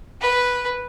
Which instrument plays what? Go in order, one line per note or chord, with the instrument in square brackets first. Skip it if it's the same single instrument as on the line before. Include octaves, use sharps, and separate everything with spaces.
[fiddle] B4